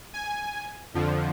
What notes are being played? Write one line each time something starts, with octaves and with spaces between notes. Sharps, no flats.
G#5
F2 D3 F3